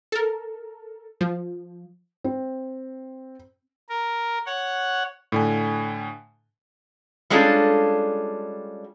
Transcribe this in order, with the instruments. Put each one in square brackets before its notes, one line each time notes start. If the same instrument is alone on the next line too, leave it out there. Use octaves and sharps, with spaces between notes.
[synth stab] A4 A#4
F3
[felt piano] C4
[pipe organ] A#4
C#5 F#5
[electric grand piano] A2 D3 G#5
[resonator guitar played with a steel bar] G3 G#3 C#4 D4 F4 A4